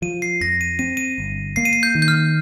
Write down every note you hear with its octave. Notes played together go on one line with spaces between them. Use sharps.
F3 D#7
C7
F2 A#6
D#7
C4 D#7
D#7
G1
A#3 C7
D#7
C7
G6
D#3
G6
F6